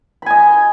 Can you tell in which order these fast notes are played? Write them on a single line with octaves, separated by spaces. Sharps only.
B5 G#5 D#5